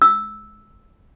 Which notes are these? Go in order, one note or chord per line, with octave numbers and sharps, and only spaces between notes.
E6